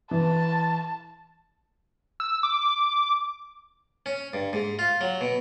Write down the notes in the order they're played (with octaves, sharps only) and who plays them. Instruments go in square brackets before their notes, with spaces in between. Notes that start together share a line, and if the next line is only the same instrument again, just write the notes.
[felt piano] E3 [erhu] A5
[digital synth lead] E6
D6
[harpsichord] C#4
G2
G#2
F4
F#3
B2